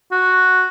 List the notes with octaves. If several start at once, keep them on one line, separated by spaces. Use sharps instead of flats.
F#4